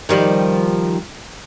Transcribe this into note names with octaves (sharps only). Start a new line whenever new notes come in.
D#3 F3 G3